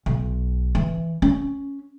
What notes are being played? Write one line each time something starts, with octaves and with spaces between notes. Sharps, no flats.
B1
E3
C#4